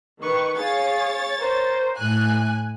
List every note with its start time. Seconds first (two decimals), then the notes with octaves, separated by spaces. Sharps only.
0.22 D#3 B4 C#6
0.57 G#4 C#5 F5 A6
1.37 A#4 C5
1.97 A2 G#5 F#6